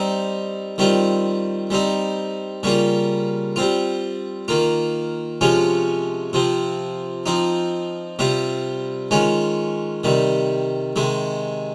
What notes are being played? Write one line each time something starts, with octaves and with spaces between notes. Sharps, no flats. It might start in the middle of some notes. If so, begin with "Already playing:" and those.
Already playing: G3 C4 D#4
D#3 G3 C4 F4
G3 C4 D#4
C#3 G3 A#3 F4
G3 C4 F4
D#3 A#3 F4
C3 F3 G#3 C#4 F4
C3 F3 C4
F3 C4 D#4
C3 G3 C4 F4
D#3 G#3 C#4 F4
C3 D#3 G3
C3 D#3 G#3